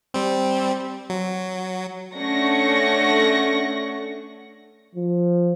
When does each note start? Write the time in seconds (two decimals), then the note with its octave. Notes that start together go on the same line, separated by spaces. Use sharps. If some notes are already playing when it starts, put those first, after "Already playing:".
0.14 G3 C4
1.10 F#3
2.15 A3 C#4 D4 F#5 C#6 A#6
4.95 F3